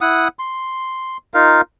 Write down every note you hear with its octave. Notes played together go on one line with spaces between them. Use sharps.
E4 F#5 D#6
C6
D#4 F4 A#4 F5